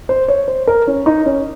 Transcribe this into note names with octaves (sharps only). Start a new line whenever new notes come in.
C5
C#5
C5
A#4
C#4
D#4
C#4